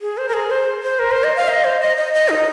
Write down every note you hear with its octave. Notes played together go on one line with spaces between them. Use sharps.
G#4
C5
A#4
G#4
C5
C5
A#4
C5
D#5
F5
D#5
C5
D#5
D#5
D#5
D#4